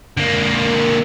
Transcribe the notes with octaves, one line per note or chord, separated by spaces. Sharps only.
D3 A#3